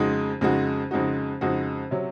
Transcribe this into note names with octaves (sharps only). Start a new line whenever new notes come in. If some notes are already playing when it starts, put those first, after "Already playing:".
Already playing: F2 C#3 G#3 D#4 F#4
F2 C#3 G#3 D#4 F#4
F2 C#3 G#3 D#4 F#4
F2 C#3 G#3 D#4 F#4
C3 F#3 C#4